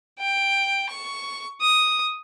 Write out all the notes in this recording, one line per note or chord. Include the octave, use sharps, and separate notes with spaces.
G5
C#6
D#6